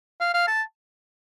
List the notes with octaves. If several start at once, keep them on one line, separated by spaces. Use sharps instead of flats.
F5
F5
A5